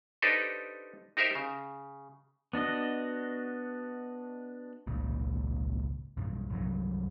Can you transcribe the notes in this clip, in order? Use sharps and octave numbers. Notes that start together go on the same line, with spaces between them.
D4 D#4 G4 A4 B4 C5
D#4 G4 A#4 C5 E5
C#3
B3 D4 F#4 D#5
G#1 C#2 A#2
B1 G2
C2 G2 F3 F#3